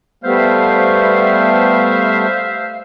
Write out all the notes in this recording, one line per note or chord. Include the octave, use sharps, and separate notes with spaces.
G3 A3 B3 C5 E5 F5